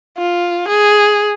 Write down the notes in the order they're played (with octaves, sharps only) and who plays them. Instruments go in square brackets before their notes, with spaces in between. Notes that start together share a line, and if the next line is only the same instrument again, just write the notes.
[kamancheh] F4
G#4